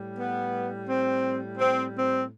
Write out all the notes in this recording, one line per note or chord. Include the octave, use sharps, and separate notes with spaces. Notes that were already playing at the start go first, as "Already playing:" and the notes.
Already playing: A2 G3
B3
C4
C4
C4